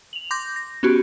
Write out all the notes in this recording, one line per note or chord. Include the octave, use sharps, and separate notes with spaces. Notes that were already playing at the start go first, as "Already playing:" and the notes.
F7 F#7
C6 D6 G6 A#6
A#6
B3 C#4 F#4 G4